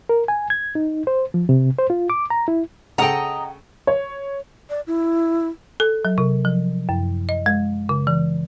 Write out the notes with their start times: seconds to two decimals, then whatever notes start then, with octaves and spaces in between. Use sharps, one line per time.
0.09 A#4
0.28 G#5
0.50 G#6
0.75 D#4
1.07 C5
1.34 F3
1.49 C3
1.79 C5
1.90 F4
2.10 D6
2.30 A#5
2.48 E4
2.98 C#3 A4 D#5 F#5 G5 A#5
3.87 C#5
4.70 D5
4.87 E4
5.80 A4
6.05 F#3
6.18 C3
6.45 F3
6.89 F#2
7.29 D#5
7.46 G#3
7.89 C#3
8.07 E3